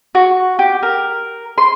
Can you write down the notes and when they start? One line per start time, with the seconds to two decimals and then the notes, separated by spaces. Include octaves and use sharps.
0.15 F#4
0.59 G4
0.83 A#4
1.58 C6